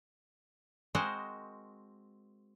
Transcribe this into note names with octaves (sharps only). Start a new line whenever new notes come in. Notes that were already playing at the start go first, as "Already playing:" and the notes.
G#3 C4 F#4 A#4 C5 D#5